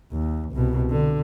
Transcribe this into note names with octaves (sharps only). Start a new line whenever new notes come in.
D#2
C2 B2
D3